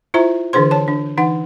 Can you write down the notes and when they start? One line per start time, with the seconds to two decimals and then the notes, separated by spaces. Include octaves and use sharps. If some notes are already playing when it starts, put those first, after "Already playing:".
0.14 E4 F4 C5 E5 A#5
0.53 D3 E3 D4 G#4 C5 C6
0.71 C#5 A5
0.88 D4
1.17 E3 D#4 F#5